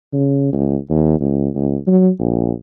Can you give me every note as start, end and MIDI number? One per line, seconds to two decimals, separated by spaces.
0.13 0.51 49
0.53 0.77 37
0.90 1.20 39
1.20 1.49 37
1.55 1.77 37
1.88 2.10 54
2.20 2.52 34